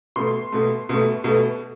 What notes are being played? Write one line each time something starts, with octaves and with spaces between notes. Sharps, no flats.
B2 A3 C6
B2 A3
B2 A3
B2 A3